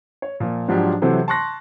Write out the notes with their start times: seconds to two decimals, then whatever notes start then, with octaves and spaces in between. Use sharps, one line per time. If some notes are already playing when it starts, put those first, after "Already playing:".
0.22 C#5
0.40 A#2 F3
0.68 G#2 F3 F#3 D4 F4 G4
1.02 C3 E3 F#3 A4 C5
1.28 A5 C6 C#6 F#6 A#6